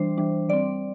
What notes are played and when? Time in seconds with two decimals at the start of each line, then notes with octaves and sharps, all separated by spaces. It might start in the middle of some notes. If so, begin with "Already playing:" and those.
Already playing: E3 G3 D4 C5
0.18 E3 G3 D4
0.49 G3 C4 D5